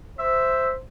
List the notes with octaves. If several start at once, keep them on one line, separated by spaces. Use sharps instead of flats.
C5 E5